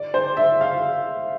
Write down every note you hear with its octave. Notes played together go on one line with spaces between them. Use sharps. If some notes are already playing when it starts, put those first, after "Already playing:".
Already playing: D5
C5
E5
F5